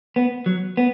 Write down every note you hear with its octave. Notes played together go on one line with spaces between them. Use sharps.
B3
F#3
B3